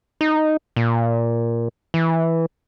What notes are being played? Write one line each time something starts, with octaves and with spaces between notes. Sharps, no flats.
D#4
A#2
E3